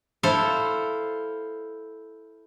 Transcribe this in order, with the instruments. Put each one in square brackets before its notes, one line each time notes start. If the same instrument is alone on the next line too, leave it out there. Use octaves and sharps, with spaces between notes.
[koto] E4 A4 C5 F5